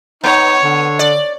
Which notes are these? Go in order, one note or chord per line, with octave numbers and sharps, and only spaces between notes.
B3 D#4 C#5
D3
D5